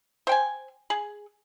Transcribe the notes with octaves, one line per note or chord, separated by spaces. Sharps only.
C5 G5 G#5
G#4